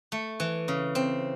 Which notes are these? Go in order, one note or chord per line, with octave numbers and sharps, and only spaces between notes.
A3
E3
C#3
C4